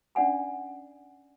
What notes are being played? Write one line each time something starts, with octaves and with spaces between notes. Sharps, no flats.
C#4 D4 D5 F#5 G#5 A#5